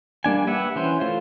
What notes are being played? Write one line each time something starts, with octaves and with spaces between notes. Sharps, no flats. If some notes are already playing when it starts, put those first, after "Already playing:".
G3 A#3 D4 G#5
G4 B4 E5 F#5
E3 C#4 C5
A3 F4 C5